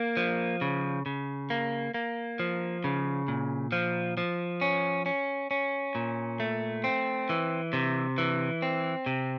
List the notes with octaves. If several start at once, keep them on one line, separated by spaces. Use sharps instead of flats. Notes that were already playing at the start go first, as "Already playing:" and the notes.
Already playing: A#3
F3
C#3
C#3
A#3
A#3
F3
C#3
A#2
F3
F3
C#4
C#4
C#4
A#2
A3
C4
E3
C3
E3
C4
C3